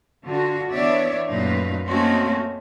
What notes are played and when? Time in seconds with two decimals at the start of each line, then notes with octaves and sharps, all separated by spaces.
0.25 D3 F4 F#4
0.71 E3 B3 D4 C#5 D5 E5
1.29 F#2 A#2 A3 D#4 B4 F5
1.85 A3 A#3 C4 C#4 D#4 F#4